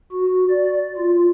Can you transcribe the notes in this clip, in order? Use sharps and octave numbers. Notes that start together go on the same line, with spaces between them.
F#4
D5
F4